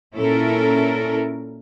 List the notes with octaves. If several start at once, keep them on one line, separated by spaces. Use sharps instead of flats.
A#2 C#4 E4 A4 A#4